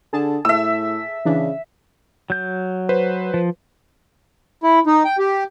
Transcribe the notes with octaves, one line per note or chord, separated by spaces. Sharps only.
D3 G#4 A5
A2 E5 E6
C#3 E3 D4
F#3 G6
B4 C5
F3
E4
D#4
G5
G4